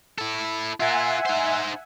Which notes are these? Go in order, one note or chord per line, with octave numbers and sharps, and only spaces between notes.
E4 A4
F4 A#4 E5 F#5 G#5
D#4 C5